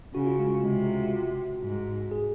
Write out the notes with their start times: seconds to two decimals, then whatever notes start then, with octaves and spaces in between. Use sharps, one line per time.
0.14 C#3 F#4
0.27 F4
0.39 G#3
0.63 C3 G#3
0.76 G#3
0.88 F4
1.01 F#4
1.62 G#2
2.11 G#4